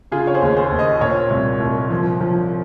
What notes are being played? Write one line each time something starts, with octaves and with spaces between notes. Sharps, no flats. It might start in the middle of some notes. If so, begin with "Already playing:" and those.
C#3 F4 G#4
C#5
G#4 C5
D#2
G#4 C5
D#2
C5 D#5
A#2 A#4 C#5
C2
C2
F3
F3